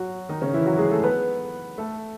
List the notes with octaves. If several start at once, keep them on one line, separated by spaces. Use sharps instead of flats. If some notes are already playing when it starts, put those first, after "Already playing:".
Already playing: F#3 F#4
D#3 D#4
C#3 C#4
E3 E4
F#3 F#4
G#3 G#4
A3 A4
B3 B4
A3 A4